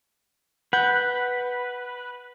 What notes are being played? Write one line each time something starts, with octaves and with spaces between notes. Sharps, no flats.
B4 F#5 G6